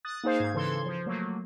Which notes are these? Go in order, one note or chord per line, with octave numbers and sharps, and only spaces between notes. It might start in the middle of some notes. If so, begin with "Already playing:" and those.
D#6 F#6 A6
A#3 D#4 G#4 C5 F5
G#2 G#6
C#3 E3 A4 C6 G#6
F3
F#3 A3 A#3